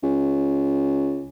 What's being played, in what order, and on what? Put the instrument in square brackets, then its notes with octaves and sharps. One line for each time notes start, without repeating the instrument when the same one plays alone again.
[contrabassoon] C#2